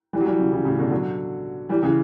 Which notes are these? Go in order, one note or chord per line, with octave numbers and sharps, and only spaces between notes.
E3 G3
F#3
E3 G3
C#3 E3
C#3 E3
A2 C#3
B2 D3
D3 F#3
E3 G3
C#3 E3